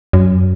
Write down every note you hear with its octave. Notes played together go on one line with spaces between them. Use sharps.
F#2